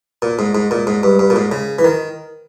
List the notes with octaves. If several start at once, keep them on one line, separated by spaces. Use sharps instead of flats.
A#2
G#2
G#2
A#2
G#2
G2
G2
A#2
G#2
C#3
E3
D#3